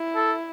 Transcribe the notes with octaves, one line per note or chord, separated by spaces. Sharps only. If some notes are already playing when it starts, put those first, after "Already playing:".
Already playing: E4
A4